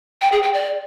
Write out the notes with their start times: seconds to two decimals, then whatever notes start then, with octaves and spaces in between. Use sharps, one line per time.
0.21 G5
0.32 G#4
0.43 G5
0.54 D5